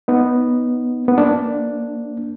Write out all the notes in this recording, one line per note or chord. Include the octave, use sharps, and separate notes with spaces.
B3 D#4
B3
A#3 D4